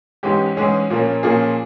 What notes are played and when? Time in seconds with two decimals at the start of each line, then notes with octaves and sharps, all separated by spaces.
0.23 G#2 E3 G#3 C#4 G4
0.57 G#2 E3 G#3 C#4 G#4
0.90 A#2 F3 A#3 C#4
1.23 A#2 F3 A#3 C#4 G#4